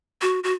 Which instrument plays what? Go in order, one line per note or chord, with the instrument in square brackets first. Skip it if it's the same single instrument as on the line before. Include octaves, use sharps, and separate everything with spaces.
[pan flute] F#4
F#4